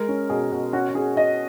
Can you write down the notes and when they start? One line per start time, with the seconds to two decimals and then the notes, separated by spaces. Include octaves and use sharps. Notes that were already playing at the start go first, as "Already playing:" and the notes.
Already playing: G#3 A#4
0.08 C#4
0.29 B2 G#4
0.52 B2
0.73 C#4 F#4
0.89 F#4
0.95 C#4 G#4
1.16 C#4 D#5